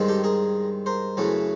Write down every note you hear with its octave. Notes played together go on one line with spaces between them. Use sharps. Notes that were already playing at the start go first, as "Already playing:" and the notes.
Already playing: G2 D#3 G#3 C4
G4 A4
G#4 A#4
A#4 C5
F#2 C#3 E3 A3